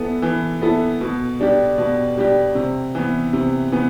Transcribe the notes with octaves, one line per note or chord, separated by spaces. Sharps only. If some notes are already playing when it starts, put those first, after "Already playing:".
Already playing: E3 B3 E4 A4
E3
B3 E4 A4
B2
G3 D4 G4
B2
G3 D4 G4
C3
E3 B3
C3
E3 B3